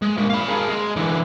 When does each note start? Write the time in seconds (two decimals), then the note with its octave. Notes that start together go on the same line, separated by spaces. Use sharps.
0.02 G#3
0.17 F3 A#3
0.30 F5 B5
0.48 G#4 A#4
0.68 G#3
0.96 D3 E3